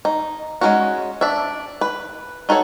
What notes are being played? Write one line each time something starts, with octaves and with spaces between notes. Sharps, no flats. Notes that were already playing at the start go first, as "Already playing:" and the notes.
D#4
G#3 A#3 C#4 D#4 F#4
D4 E5
B4
D#4 F#4 A4 C#5